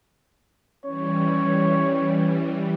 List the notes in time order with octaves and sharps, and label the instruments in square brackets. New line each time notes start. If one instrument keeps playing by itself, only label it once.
[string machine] E3 G3 [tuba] C#4 [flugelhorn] C#5